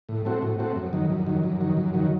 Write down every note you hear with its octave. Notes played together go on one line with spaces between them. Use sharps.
A2
A3 C4 F#4
A2
A3 C4 F#4
F#2
D#3 F#3
F#2
D#3 F#3
F#2
D#3 F#3
F#2
D#3 F#3